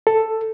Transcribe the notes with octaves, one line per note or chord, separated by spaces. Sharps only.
A4